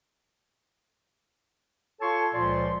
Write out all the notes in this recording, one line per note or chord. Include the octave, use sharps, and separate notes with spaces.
F4 A4 C#5 A5 C6 C#6
C#2 A#2 F3 D5 C6